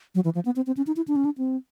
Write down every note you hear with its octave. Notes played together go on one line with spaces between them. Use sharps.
F#3
E3
F3
B3
C4
C4
C#4
D#4
E4
D4
C#4
D4
C4